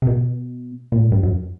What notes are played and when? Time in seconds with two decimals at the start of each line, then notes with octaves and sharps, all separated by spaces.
0.02 C3
0.07 B2
0.92 A#2
1.00 A2
1.12 G2
1.23 F#2